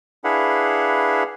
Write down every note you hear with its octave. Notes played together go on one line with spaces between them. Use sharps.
D4 E4 G#4 B4 F5 F#5